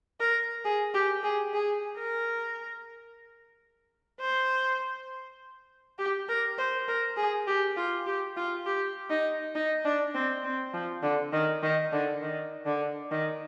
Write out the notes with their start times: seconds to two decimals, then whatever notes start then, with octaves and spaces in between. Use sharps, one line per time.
0.20 A#4
0.65 G#4
0.94 G4
1.24 G#4
1.54 G#4
1.98 A#4
4.21 C5
5.99 G4
6.29 A#4
6.58 C5
6.88 A#4
7.17 G#4
7.48 G4
7.77 F4
8.07 G4
8.36 F4
8.66 G4
9.10 D#4
9.55 D#4
9.84 D4
10.14 C4
10.44 C4
10.74 F3
11.03 D3
11.33 D#3
11.63 D#3
11.92 D3
12.22 D#3
12.66 D3
13.11 D#3